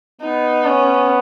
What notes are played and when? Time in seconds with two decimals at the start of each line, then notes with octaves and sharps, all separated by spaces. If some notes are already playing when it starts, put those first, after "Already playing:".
0.22 B3 D#4
0.67 C#4